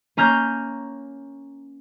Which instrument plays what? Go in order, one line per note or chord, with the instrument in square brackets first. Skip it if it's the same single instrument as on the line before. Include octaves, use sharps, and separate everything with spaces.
[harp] A#3 C#4 A#5 F6 G6